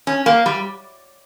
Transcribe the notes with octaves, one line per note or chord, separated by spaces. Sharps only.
C#4
A#3
G3